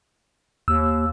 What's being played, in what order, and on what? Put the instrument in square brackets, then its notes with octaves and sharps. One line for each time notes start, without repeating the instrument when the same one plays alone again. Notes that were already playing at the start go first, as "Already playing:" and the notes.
[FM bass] D#2 [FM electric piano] E6